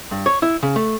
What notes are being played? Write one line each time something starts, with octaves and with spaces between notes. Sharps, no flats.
G2
C#5
E4
C#3
A3